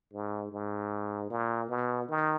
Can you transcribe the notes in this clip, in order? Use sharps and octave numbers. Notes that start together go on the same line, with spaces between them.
G#2
G#2
A#2
B2
D#3